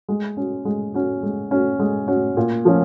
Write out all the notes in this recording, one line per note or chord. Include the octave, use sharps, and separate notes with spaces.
G#3
C#4 F#4
G#3
C#4 F#4
G#3
C#4 F#4
G#3
C#4 F#4
A#2
F3 A#3 C#4